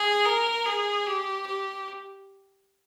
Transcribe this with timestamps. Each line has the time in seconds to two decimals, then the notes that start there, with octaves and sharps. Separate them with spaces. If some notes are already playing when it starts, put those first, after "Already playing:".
Already playing: G#4
0.25 A#4
0.66 G#4
1.06 G4
1.47 G4